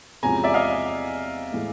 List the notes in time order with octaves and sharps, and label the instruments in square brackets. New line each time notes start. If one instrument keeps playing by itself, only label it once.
[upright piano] E2 C3 F3 G#3 C#4 [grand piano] G#5 A#5
[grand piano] D5 E5
D#5 F5
[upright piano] A2 E3 G#3